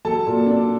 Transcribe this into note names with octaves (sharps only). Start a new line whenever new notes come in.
F#3 A4 A5
A#2
D4